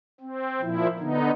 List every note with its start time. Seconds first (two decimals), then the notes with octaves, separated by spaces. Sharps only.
0.20 C4
0.61 A#2 F3 E4
0.99 D3 B3 D#4